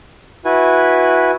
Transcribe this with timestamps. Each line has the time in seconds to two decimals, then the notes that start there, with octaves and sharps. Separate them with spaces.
0.45 E4 F#4 B4 G#5